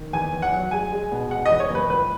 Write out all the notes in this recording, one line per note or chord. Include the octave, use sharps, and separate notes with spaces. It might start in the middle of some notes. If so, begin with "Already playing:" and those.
Already playing: D#3
E2 G#5
E2
F#5
F#3
G#3 G#5
G#3
B2
G#3 F#5
E2 D#5
C#5
F#1 B4
C#2 B4